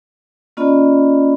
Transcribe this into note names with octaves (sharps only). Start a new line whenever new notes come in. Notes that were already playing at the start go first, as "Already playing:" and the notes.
A#3 C#4 F4 D5 D#5 B5